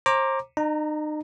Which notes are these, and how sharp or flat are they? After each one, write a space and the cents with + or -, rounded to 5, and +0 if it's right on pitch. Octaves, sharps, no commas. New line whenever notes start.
C5 +35 A#5 +0 D6 +0
D#4 -40 A#5 +0